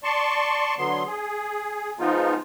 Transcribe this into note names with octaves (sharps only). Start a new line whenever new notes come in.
D5 A5 C6 C#6
D3 F#3 B3 C6
G#4
F3 G#3 B3 D#4 F4